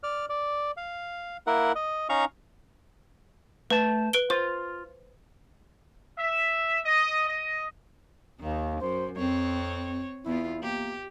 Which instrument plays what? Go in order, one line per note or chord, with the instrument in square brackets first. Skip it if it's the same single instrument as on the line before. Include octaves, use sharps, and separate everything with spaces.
[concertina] D5 F6
D5
F5
A#3 E4 A#4 F#5
D#5
C#4 D#4 F5 A#5 C#6
[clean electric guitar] A3 A5 [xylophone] B4
[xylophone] B4 D7 G7
[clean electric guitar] F4 [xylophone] C5
[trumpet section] E5
D#5
D#5
[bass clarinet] D#2 [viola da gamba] D#3
[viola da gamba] F#2 [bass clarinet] C5
[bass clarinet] F2 [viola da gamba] C4 C#5
[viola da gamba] E2 B3 F4 [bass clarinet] E4
[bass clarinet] A#3 [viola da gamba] G4